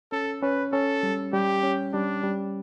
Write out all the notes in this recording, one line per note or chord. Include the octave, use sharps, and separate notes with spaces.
C#4 A4
C#4 B4
C#4 A4
G3
G3 G4
C#4
G3 D4
G3